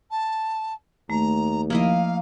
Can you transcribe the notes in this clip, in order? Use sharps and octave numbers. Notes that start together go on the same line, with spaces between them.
A5
D#2 A3 A#5
F3 A#3 E4 D#5 F5